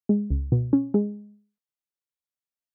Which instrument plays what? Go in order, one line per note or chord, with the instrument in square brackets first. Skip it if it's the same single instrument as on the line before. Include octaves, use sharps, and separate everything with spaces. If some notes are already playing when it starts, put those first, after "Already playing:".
[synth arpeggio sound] G#3
C#2
B2
C#4
G#3